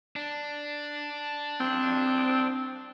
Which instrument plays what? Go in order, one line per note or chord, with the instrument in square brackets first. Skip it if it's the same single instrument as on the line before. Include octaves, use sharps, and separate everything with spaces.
[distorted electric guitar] D4
[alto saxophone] C4